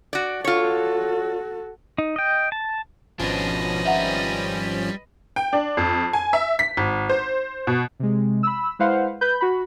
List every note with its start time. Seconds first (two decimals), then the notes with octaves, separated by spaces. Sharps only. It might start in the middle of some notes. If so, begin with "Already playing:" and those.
0.13 F#4 D5
0.44 F4 F#4 A4 C#5
1.98 D#4
2.16 D#5 G5
2.52 A5
3.19 G#1 B2 F3 C#4 D4 B4 D#5
3.85 G3 E5 F#5 A#5
5.36 G5
5.53 D4
5.77 F2
6.13 G#5
6.33 E5
6.59 B6
6.77 G#1
7.10 C5
7.67 B2
8.00 C3 G#3
8.43 B5 E6
8.79 G#3 E4 B4 C5 F5 F#5
9.21 B4 B5 G6
9.41 F#4 B5